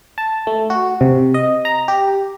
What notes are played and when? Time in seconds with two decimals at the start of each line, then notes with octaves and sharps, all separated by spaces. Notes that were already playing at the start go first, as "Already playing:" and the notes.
0.18 A5
0.47 A3
0.70 F#4
1.01 C3
1.34 D#5
1.65 A#5
1.88 G4